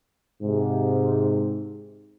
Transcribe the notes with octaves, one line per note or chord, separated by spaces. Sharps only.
G#2 C3